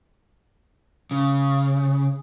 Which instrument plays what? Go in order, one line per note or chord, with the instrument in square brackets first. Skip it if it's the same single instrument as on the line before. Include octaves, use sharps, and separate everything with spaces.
[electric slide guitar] C#3